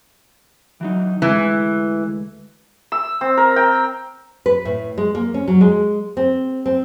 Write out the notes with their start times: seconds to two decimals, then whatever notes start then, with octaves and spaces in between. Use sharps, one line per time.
0.81 E3 F#3 D#4
1.22 D2 E3 G#3
2.92 E6
3.21 C4
3.37 A#4
3.56 G5
4.46 B4
4.65 A2
4.98 G#3
5.15 A#3
5.34 C#4
5.48 F#3
5.61 G#3
6.17 C4
6.66 C4